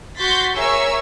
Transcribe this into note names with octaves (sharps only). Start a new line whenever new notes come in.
F#4 C6 G6 A6 B6
G#4 A#4 C#5 E5 C#6 E6